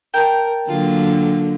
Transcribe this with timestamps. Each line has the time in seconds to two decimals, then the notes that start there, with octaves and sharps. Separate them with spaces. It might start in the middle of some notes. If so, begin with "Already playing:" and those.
0.14 A#4 G5 A5
0.69 D3 F#3 A#3 F4